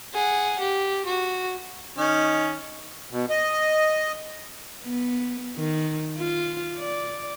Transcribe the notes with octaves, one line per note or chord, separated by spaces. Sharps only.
G#4 F#5
G4
F#4
D#3 C#4 D#4
B2
D#5
B3
D#3
F4
D5